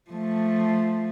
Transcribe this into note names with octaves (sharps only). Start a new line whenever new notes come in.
F3 A3